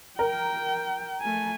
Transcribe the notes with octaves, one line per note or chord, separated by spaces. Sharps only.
A#4 G5
A3 G#5